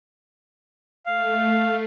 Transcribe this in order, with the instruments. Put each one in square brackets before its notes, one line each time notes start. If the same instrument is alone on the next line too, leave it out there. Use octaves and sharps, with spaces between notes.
[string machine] A3 [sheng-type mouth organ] F5